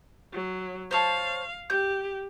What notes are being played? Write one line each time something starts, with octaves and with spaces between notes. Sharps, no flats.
F#3
C5 C#5 F5 A5
G4 G6